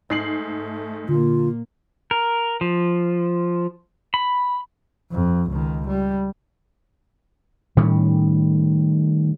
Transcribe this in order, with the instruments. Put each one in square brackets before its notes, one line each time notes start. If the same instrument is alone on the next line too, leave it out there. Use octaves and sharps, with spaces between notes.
[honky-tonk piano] G#2 C7 F#7 [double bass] A3
[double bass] A#2 A#3 [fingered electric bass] D3 [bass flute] F4
[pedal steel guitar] A#4
F3
B5
[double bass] F2
C#2 D#3
G3
[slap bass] A2 D#3 G3 C#4